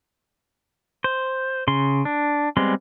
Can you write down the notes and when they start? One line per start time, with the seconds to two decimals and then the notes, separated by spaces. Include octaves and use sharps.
1.04 C5
1.68 C#3 C6
2.05 D4
2.57 G3 G#3 B3 C4 C6